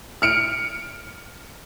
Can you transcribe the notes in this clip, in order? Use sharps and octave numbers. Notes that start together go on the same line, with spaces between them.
F6 C#7 D7